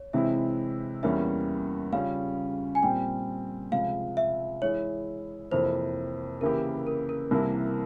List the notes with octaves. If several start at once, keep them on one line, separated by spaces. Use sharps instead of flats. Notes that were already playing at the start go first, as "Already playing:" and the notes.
Already playing: C#5
C3 E3 G#3 C4 E4 E5
E2 E3 G3 A#3 C#4 E5
C#3 G3 C#4 F4 F5
G#5
A#2 G3 C4 G5
C#2 C3 F3 G#3 F5
E5
E3 G#3 E4 G#4 C#5
F2 C3 E3 A#3 C5
C#3 E3 A#3 E4 G4 A#4
A#4
A#4
C2 C3 E3 A#3 E4